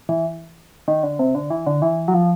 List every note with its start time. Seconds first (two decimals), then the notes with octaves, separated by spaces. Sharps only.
0.09 E3
0.88 D#3
1.03 D3
1.19 C3
1.35 D3
1.50 E3
1.67 D3
1.82 E3
2.08 F#3
2.14 F3